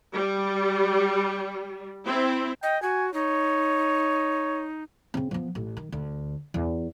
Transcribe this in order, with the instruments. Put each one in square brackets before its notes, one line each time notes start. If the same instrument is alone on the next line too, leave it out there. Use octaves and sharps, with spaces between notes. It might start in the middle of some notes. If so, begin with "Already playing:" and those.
[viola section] G3
C4 E4
[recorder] D#5 [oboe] G5
[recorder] F#4 [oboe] G#5
[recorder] D#4 [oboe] C#5
[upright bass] C#3 C4
F3 B3
A1
D#3
D2
E2